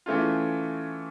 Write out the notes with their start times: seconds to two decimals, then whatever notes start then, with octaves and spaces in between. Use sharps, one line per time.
0.06 E3 A3 C#4 F4